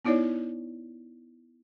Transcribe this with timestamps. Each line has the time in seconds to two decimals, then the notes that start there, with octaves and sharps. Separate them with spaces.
0.05 B3 D#4 E4 C#5 D5